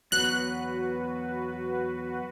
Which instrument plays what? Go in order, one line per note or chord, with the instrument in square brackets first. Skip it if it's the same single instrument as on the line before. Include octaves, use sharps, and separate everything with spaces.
[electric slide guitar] E2 F#3 B3 [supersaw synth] F#4 B4 [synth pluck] F#6